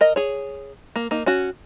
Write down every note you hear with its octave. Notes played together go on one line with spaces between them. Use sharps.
A#4 D#5
G#4 C#5
A#3
A#3 D#4
C#4 F#4